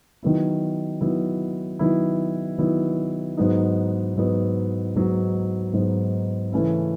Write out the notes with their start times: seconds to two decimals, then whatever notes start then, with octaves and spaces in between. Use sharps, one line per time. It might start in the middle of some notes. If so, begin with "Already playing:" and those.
0.23 D#3 F#3 B3 E4
1.01 D#3 F#3 B3 E4
1.79 D#3 F#3 B3 E4
2.58 D#3 F#3 B3 E4
3.37 G#2 F#3 B3 D#4
4.16 G#2 F#3 B3 D#4
4.95 G#2 F#3 B3 D#4
5.73 G#2 F#3 B3 D#4
6.52 C#3 E3 A3 C#4 E4